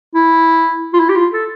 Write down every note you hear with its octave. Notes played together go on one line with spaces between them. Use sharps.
E4
F4
E4
G4
F4
A4